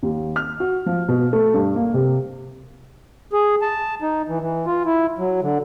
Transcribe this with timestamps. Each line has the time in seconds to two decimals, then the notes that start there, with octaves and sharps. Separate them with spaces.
0.03 D#2
0.36 F6
0.60 F#4
0.86 F3
1.08 B2
1.33 A3
1.54 G2
1.76 A#3
1.94 C3
3.33 G#4
3.62 A5
4.02 D#4
4.28 E3
4.41 E3
4.66 F4
4.85 E4
5.18 F#3
5.42 D3